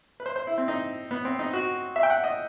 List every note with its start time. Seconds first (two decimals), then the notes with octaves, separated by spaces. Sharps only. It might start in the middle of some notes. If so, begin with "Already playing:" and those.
0.20 B4
0.26 C5
0.36 C5
0.47 E4
0.58 C4
0.68 D#4
1.11 B3
1.25 C4
1.39 D#4
1.53 F#4
1.96 E5
2.03 G5
2.10 F#5
2.24 D#5